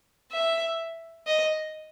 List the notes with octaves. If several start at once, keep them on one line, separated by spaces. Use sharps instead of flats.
E5
D#5